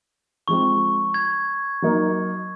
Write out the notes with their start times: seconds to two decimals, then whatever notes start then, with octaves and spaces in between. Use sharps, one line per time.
0.48 F3 G#3 C4 C#6
1.14 G#6
1.82 F#3 A#3 D#4 A#4